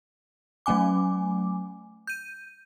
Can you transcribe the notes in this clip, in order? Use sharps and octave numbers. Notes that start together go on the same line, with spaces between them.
F#3 A3 C#4 G#5 D6
G6 D#7